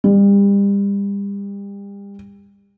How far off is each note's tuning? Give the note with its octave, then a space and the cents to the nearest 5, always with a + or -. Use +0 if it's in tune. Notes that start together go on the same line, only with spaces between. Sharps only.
G3 +35